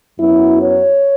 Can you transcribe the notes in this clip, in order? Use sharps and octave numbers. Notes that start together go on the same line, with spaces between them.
F#2 F#3 B3 E4
C#5